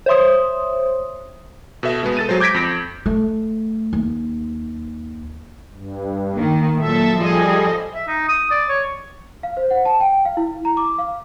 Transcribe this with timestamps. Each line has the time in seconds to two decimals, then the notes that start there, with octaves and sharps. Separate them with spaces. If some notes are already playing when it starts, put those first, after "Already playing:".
0.06 C5 C#5 E5 C6 D#6
1.83 B2 A4 E5
2.03 B2 G#3 B3
2.17 A4 A6 D#7
2.29 F#3 G#3 C5
2.40 D6 G6 G#6 A#6 B6 D7
2.54 F2 A#6 B6
3.06 A3
3.93 D#2
5.74 G2
6.33 D#3 A#3
6.78 A#2 F#3 A4 E5
7.17 F3 G3 G#4 A4 D#5
7.94 E5
8.08 D#4
8.28 D#6
8.51 D5
8.69 C#5
9.43 F5
9.57 C5
9.71 F#5
9.85 A5
10.00 G5
10.25 F5
10.37 E4
10.65 A#5
10.77 D6
10.98 F5